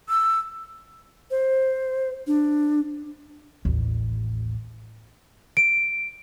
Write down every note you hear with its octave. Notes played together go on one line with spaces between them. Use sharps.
E6
C5
D4
A1 D#2
D7